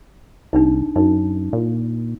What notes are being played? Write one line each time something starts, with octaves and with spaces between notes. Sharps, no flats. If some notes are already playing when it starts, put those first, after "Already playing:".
C2 D4 D#4
F#2 D#4
A#2